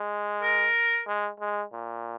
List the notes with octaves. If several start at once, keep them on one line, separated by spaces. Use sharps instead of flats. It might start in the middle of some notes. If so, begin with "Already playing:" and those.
Already playing: G#3
A#4
G#3
G#3
A#2